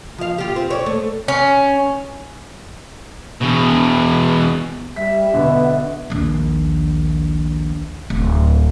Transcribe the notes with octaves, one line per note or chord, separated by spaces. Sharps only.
F3 F5
F4 G4
C4
C#5 D5
A3
C#4
E2 B2
G3 E5 B6
B2 D3 B3
A#1 D#2
D1